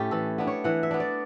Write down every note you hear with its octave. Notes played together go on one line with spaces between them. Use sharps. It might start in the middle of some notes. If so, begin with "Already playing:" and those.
Already playing: A2 A3 C#4 E4 G4
E3 A4
B3 D4
C#5
E3 F#5
E5
B3 D4
D5